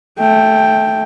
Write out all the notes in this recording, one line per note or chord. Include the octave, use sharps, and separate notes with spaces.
A3 G5